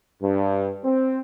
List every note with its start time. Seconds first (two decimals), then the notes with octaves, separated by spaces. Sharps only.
0.22 G2
0.83 C4